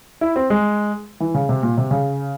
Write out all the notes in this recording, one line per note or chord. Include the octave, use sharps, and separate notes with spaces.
E4
C4
G#3
E3
C#3
C3
A#2
C3
C#3